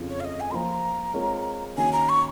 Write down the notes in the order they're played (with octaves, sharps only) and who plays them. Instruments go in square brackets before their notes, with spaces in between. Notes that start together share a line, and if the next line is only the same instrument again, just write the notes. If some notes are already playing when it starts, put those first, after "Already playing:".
Already playing: [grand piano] F2 C#3 F3
[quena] C#5
F5
D#5
G#5
[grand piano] F3 A#3 F4 C5 [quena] A#5 C6
[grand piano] G#3 C4 F4 A#4 C#5
[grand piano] D#3 A#3 C#4 F#4 [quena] G#5
[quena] A#5
C#6